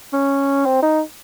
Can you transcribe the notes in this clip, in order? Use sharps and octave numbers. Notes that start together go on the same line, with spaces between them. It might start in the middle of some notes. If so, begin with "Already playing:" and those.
C#4
C4
D#4